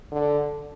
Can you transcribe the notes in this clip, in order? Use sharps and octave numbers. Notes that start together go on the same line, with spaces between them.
D3